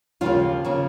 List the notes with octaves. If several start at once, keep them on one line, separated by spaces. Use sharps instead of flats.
D#2 C#3 F3 A#3 F4
C#3 F3 A#3